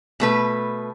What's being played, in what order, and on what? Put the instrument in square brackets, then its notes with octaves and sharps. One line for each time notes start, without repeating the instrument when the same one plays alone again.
[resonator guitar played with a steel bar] B2 A3 B4